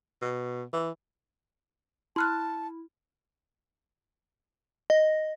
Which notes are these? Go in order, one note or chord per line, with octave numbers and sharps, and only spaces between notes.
B2
E3
E4 A5 C6 F6 F#6
D#5